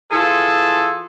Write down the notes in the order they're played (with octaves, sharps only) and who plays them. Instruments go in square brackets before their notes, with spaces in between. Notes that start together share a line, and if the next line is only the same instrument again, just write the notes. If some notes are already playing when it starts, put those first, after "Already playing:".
[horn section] E3 F4 G#4 A4